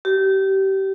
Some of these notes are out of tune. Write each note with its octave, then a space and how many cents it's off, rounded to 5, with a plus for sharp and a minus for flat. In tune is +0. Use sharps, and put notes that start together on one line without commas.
G4 -25